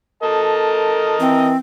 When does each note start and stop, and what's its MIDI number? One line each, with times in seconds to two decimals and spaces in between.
0.23 1.16 69
0.23 1.51 70
0.23 1.51 75
0.23 1.51 81
1.20 1.55 52
1.20 1.57 60